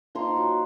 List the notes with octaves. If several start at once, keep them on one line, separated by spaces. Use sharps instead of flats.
F3 A#3 D#4 A#5 C6
F#3